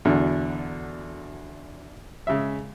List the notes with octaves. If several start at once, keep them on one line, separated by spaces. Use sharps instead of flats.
E2 B2 D3 F#3
C#3 G#3 E5